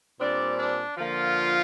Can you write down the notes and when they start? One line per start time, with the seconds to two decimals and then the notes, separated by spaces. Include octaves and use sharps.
0.19 A#2 G3 C4 D4 D5
0.57 D4
0.97 D3 F3 A#3 F4